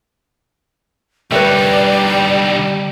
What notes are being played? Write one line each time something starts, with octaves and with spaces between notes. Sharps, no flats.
D3 G3 D#4 B4 C#5 D5 E5